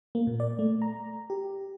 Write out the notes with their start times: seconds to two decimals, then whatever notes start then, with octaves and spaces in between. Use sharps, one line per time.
0.15 A#3
0.27 A#2
0.40 D5
0.59 A3
0.82 A#5
1.30 G4